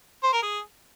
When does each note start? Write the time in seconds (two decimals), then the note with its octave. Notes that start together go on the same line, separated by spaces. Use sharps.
0.23 C5
0.33 A#4
0.42 G#4